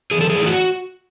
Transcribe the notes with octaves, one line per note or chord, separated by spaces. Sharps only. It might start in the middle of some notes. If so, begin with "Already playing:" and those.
E3 G#4
A4
G#4
A2
E4
F#4